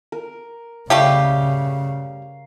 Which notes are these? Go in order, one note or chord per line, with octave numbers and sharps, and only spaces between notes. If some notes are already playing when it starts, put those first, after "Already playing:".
A#4
C#3 G3 A3 G4 F5